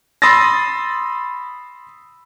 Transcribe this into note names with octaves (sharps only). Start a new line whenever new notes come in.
B5 C6 D#6 E6 A6 A#6